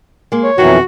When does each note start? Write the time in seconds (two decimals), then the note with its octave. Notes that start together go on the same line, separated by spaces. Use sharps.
0.32 G#3 A#3
0.44 C#5
0.58 F2 B2 D#3 E3 F#3 F#4